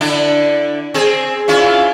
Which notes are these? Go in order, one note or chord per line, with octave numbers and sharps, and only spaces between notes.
D3 D4 E4
C4 G#4
C#4 E4 F4